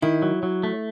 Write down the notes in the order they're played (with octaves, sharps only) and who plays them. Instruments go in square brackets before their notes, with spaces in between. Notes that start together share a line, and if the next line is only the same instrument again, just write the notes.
[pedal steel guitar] D#3 [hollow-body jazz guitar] E4
[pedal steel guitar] F#3
F#3
A3